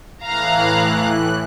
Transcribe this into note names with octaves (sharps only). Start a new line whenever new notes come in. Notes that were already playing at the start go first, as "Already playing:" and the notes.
A2 E3 F5 A#5 F#6